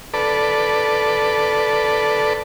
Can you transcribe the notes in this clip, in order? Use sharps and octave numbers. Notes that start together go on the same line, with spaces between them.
A4 B4 D5